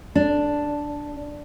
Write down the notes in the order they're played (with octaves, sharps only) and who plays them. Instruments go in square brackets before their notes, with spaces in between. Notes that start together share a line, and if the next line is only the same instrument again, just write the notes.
[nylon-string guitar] D4